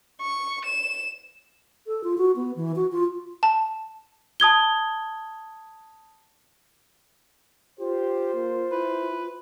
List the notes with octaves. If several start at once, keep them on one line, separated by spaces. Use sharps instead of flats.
C#6
E7
A4
F4
F#4
B3
E3
F#4
F4
A5
A5 D#6 G#6 G7
F4 G4 C5
A#3
E4 B4